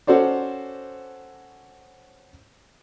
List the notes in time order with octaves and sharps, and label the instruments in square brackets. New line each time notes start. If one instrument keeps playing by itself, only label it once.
[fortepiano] C#4 F#4 A4 C5 D5